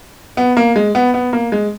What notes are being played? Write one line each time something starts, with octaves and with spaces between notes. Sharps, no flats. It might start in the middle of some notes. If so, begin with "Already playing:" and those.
B3
A#3
G#3
B3
B3
A#3
G#3